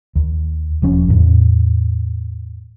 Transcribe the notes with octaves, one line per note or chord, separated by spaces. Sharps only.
D#2
E1 F3 C#4
E2 A2